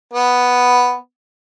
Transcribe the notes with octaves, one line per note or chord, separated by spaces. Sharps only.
B3